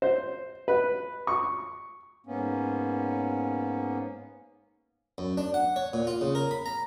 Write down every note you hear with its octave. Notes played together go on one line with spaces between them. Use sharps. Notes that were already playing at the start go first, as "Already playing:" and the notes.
C5
B4
C#6
G#2 A#3 B3 C#4
F#2
D4
F#5
C#5
A#2
F4
C#3
A#4
B5
A#5